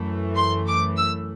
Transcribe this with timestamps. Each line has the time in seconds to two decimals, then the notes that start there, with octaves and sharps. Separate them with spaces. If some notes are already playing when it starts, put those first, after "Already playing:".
Already playing: F#2 E3 A3
0.37 C6
0.68 D6
0.97 E6